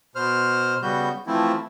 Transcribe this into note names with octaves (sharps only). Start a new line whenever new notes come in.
B2 C5 F6
C#3 G3 B3 F#4 G6
E3 F3 A3 C4 E4